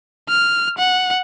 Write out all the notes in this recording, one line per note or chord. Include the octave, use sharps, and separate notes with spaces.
F6
F#5